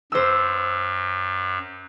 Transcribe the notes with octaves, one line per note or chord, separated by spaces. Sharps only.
F#2 C5 E6